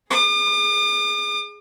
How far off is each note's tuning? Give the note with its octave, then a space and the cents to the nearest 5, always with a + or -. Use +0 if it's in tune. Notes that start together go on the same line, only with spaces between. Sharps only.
G#4 +0 D6 +45